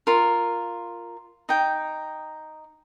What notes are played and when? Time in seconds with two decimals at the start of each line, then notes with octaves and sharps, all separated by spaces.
0.07 F4 A#4
1.49 D#4 G5